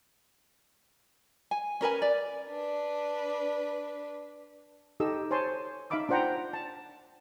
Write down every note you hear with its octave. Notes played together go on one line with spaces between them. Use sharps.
G#5
C#4 A#4 B4 G#5
D5
D4 B4
D#4 G4 A4 D#5 E6
C5 C#5 G#5 A5 C6
D#4 E5 F5 B5 D6 E6
D4 F4 C5 F#5 G5 A#5
A5